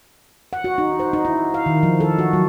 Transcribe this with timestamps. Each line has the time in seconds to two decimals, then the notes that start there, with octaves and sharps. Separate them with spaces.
0.53 F#5
0.64 F#4
0.78 D#4
1.00 C5
1.13 D#4
1.25 E4
1.54 F5
1.66 D#3
1.83 F3
2.00 A4
2.19 F#4
2.33 F#3